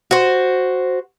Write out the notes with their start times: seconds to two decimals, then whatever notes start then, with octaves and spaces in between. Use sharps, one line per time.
0.11 F#4 C5